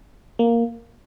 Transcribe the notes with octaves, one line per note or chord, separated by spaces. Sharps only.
A#3